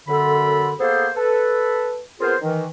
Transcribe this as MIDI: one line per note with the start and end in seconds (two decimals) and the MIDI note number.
0.08 0.73 42
0.08 0.73 50
0.08 0.73 69
0.08 0.73 83
0.80 1.08 58
0.80 1.08 59
0.80 1.08 68
0.80 1.08 69
0.80 1.08 72
1.15 2.01 69
1.15 2.01 71
2.20 2.35 59
2.20 2.35 60
2.20 2.35 65
2.20 2.35 68
2.20 2.35 70
2.20 2.35 72
2.41 2.66 51
2.41 2.66 52